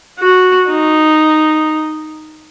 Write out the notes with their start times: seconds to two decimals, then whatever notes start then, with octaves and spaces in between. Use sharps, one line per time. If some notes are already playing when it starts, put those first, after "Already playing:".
0.19 F#4
0.70 D#4